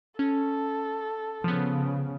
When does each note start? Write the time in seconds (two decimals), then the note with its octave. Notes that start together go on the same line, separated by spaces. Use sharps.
0.19 C#4 A4
1.44 C#3 F3 B3